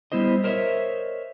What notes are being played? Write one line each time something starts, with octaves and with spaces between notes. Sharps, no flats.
G3 B3 E4 C5 D#5
A#4 C5 C#5 D#5 E5